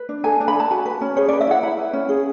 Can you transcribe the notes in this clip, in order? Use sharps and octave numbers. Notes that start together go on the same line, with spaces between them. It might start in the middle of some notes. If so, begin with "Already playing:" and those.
Already playing: B4
D4
A4 G#5
D4
B5
A4 A5
F#4 G#5
B4
C#4
G#4 C#5
B4 D5
E5
E4 F#5
E4 B5
B4
C#4
G#4